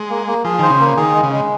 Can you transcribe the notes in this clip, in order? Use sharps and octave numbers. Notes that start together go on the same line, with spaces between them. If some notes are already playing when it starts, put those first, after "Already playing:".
Already playing: G#3
A#3
A#3
F3 G#4
D#3 C5
C#3
A#3
D#3 G#4
G#3
C#3
G#3